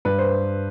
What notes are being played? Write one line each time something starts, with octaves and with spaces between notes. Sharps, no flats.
G2 B4
C5